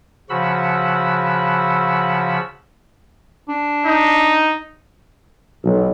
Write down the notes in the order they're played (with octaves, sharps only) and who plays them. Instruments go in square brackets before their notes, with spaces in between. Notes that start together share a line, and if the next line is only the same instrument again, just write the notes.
[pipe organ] C#3 F3 F#4 F#5 B5 E6
[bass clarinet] D4
[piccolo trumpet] D#4
[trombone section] B1